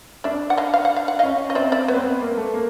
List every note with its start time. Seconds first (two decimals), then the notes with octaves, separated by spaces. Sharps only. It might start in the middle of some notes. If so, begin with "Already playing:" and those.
0.24 D4 D5 E5
0.50 F#5
0.57 D#5 F5
0.74 F5
0.85 F#5
0.96 F5
1.08 F#5
1.19 C#4 D#5 F5
1.50 D#5
1.55 C4 D5 E5
1.72 D5 E5
1.88 B3 B4 C#5
1.96 C4
2.04 B3
2.21 A#3
2.37 A3
2.54 A#3